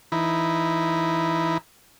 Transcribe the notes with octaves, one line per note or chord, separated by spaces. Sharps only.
E3 D#4 E4